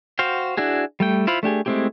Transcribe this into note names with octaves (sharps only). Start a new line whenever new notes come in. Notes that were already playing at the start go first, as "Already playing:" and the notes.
F#4 C5 F5 G5
D4 E4 F#4 G#4
G3 A3 G5
E4 F4 C5 B5
A3 D4 G4 G#4
G#3 A3 C4 E4 G4